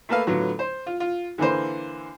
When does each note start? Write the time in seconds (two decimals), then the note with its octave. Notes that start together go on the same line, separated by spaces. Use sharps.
0.09 A3 A#3 A4 B4 F5
0.27 A2 D3 F#3 B3 F4
0.59 C5
0.87 F4
1.00 F4
1.38 D3 E3 A#3 B4 C5